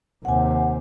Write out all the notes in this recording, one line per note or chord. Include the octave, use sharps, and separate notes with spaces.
D#2 C3 F#5 G#5